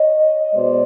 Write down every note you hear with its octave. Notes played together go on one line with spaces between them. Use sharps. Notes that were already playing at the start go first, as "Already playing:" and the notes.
Already playing: C#5 D#5
B2 G#3 C5 D5